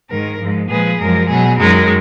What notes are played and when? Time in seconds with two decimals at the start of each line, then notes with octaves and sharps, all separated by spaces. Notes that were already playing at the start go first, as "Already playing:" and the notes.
0.09 G#2 D#3 G#3 A#4
0.40 G#2 F3 G#3
0.69 A#2 F3 G#3 G#4 B4
0.99 F#2 F3 G#3 A#4
1.28 B2 F#3 G#4
1.59 F#2 D#3 G#3 A#4